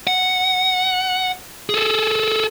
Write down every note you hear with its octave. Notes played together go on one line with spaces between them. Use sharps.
F#5
G#4 A4